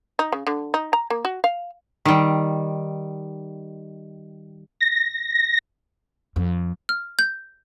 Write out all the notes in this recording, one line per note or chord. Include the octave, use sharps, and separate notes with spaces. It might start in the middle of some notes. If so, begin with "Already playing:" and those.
D#4
C#3
D3
D#4
A#5
A#3
F#4
F5
D#3 G3
A#6
F2
F6
G6